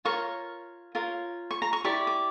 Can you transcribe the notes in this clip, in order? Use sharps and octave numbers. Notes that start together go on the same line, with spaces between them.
F4 A#4 C#5 C#6
F4 A#4 C#5
C#6
A#5
C#6
E4 G4 D5 C#6
D6